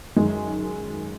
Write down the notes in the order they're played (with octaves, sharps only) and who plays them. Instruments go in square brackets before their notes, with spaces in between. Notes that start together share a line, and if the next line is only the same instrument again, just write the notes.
[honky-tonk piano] F#2 D#3 G#3